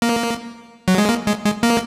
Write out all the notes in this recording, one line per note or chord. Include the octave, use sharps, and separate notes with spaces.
A#3
F#3
G#3
A#3
G#3
G#3
A#3